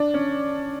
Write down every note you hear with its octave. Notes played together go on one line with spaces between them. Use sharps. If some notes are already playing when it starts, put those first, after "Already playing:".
Already playing: D4
C#4